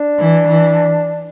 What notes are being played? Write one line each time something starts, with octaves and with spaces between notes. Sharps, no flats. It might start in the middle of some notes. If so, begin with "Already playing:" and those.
Already playing: D4
E3
E3